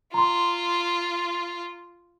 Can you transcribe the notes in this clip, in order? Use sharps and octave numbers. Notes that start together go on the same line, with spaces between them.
F4 A#5 C6